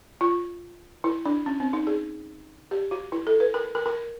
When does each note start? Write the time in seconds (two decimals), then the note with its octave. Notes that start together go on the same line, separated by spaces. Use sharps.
0.21 F4
1.04 E4
1.26 D4
1.46 C#4
1.60 C4
1.73 D#4
1.87 G#4
2.71 G4
2.91 F#4
3.12 E4
3.27 A4
3.40 B4
3.54 A#4
3.75 A#4
3.86 A#4